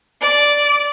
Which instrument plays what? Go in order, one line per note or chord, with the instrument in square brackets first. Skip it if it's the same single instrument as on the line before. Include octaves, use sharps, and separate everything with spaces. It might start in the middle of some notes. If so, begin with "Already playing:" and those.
[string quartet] D5